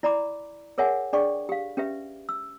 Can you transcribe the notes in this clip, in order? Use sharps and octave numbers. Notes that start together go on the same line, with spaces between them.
E4 D5 A#5 B5 D6
G#4 A#4 C#5 E5 F#5 G#5
D4 G#4 D5 G5 C#6
G4 F5
C#4 G4 B4 E5
E6